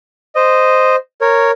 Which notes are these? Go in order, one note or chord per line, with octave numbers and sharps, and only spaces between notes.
C5 D#5
A#4 C#5